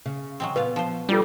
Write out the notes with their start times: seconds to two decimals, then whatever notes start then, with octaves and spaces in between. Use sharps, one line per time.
0.06 C#3
0.40 F#3 G#3 C4
0.56 A#2 B3 F4 B4 F5
0.76 F3 C5
1.09 G3 D4 F4 A4